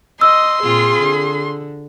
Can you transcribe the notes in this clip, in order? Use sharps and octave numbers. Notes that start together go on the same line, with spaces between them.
D#5 C6 E6
A#2 C4 F4 G#4
D3